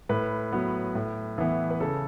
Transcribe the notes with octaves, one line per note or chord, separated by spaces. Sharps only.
A2 B4
F#3 B3
A2
E3 B3
B4
C#3 A4